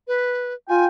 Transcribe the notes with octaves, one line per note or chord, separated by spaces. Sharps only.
B4
F4 G5 G#5